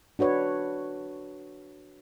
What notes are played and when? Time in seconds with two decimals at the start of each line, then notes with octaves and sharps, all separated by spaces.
0.19 D4 F#4 B4 C#5